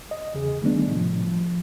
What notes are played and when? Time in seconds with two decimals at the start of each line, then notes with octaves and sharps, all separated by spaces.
0.11 D#5
0.34 E2 C#3 G#4
0.62 D#3 G3 A3 B3 D4
0.87 A2 C3 F3
1.25 F3